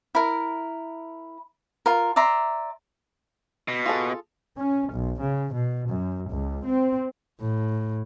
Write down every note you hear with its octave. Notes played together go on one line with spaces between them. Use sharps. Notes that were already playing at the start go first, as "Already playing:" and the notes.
E4 A#4
F4 A#4
D5 E5 A#5 C6
B2
F4 G#4 A4
C#4
B1
C#3
B2
F#2
C#2
C4
A2